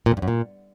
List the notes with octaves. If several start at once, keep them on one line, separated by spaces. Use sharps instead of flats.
A#2
F2
G2
F#2
A#2